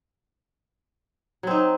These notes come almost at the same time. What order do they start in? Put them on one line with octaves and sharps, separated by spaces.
F#3 C4 D#4